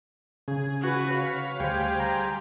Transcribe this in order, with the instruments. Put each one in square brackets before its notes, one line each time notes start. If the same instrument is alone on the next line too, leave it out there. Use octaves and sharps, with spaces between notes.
[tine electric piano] C#3 [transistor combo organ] G#4
[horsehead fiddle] F#4 B4
[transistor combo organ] C#5 B5 [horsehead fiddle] F5
[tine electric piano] D2 C5 [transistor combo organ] G3 G4 G#4
[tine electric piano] A#5 C6